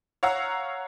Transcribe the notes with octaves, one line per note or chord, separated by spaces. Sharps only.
C#5 F5 F#5 A#5 E6